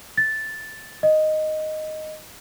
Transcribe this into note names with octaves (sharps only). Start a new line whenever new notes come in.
A6
D#5